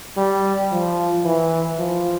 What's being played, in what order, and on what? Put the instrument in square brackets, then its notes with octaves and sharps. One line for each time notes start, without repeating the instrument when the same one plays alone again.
[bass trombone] G3
F3
E3
F3